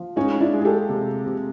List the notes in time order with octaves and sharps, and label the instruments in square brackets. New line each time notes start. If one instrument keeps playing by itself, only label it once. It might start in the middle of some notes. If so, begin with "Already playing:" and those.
Already playing: [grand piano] F3
[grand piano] G#3 [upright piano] C#4 D#4
[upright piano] D4 E4
[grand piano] G#3
[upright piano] G#4
G4 A4
[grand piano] C3
C3